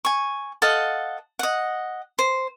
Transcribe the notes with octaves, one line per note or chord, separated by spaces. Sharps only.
G#5 C#6
A4 D#5 F5 F#5
D#5 F#5
C5